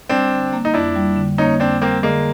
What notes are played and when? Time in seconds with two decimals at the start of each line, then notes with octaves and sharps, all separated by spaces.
0.09 G3 C4 D4
0.31 D3
0.53 A#3
0.65 D#4
0.74 F2 D4 E4
0.96 G3
1.17 D3
1.38 A#3 C#4 D#4
1.60 F2 C4 D4
1.81 G3 A#3 C4
2.03 D3 G#3 A#3